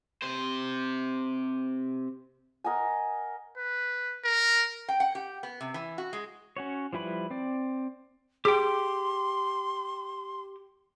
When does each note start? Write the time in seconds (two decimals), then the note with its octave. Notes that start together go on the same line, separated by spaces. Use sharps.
0.22 C3 C5
2.64 A#4 D#5 F#5 G#5
3.57 B4
4.24 A#4
4.88 G5
5.00 F#5
5.15 G4
5.43 B3
5.61 C3
5.74 E3
5.98 F#4
6.13 G#3
6.57 C#4 F#4 C#5
6.93 F3 G3 E4 B4 B5
7.31 C4 D5
8.45 G4 G#4 G5 C6